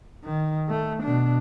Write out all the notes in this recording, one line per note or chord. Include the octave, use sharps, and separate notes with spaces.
D#3
A3
B2 D4